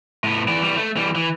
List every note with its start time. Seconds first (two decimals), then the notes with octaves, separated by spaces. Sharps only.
0.24 A2 B3
0.48 E3 D5
0.62 E3 G3
0.77 A3
0.97 E3 G3
1.16 E3